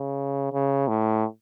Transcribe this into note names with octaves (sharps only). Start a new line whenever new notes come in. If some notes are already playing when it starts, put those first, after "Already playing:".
Already playing: C#3
C#3
A2